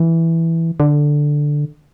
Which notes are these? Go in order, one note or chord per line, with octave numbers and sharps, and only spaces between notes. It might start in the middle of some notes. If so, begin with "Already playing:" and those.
Already playing: E3
D3